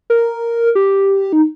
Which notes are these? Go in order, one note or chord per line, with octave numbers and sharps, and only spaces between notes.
A#4
G4
D#4